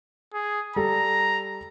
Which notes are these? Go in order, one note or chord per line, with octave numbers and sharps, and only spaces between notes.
G#4
G3 A4 A#5